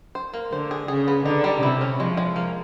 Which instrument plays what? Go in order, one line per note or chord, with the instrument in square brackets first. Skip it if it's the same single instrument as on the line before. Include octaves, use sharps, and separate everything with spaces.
[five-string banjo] C5
A#3
[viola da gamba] D3 [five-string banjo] C5
[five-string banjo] G#4
[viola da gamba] C#3 [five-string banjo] G#4
[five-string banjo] B3
[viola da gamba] D3 [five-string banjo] D#4
[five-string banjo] G3
[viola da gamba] C3 [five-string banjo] E4
[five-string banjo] C#4
[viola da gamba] F3 [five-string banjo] G#3
[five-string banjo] G#3
A#3